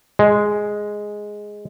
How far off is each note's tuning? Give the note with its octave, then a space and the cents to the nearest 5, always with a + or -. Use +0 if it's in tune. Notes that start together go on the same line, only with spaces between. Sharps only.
G#3 +0